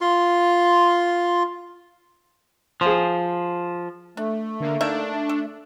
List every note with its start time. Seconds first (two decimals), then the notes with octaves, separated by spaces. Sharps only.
0.01 F4 C6
2.81 F3 G#4 C5
4.17 A3 D4
4.60 D3 A#3
4.81 A#3 D4 D#4 E5
5.29 A4